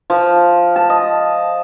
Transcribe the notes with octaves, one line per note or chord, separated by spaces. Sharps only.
F3
A5
D#5